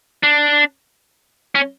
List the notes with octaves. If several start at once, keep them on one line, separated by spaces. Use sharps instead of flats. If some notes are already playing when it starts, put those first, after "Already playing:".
D4
C#4